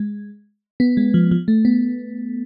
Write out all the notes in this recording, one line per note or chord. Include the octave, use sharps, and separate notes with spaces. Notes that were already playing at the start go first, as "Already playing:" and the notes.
Already playing: G#3
B3
G#3
F3
F3
A3
B3